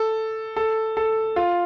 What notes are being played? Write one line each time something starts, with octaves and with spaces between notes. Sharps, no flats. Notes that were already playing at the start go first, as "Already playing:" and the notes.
Already playing: A4
A4
A4
F4